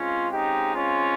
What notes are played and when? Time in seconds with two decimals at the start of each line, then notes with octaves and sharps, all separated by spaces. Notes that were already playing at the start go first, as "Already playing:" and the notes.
Already playing: C#3 G#3 C4 C#4 F4
0.31 D#4 G4
0.75 C#4 F4